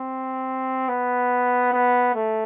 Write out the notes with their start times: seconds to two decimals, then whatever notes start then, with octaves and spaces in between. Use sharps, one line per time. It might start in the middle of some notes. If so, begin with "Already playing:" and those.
Already playing: C4
0.89 B3
1.73 B3
2.15 A3